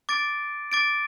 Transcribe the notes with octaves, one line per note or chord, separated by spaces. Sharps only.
D6 A6 D7
D6 A6 D7